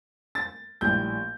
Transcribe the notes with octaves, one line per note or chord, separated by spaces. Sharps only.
A6
A#1 A2 G3 G6